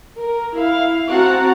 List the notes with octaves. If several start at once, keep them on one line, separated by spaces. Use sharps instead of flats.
A#4
E4 F5
C4 F#4 F#5 A5 A#5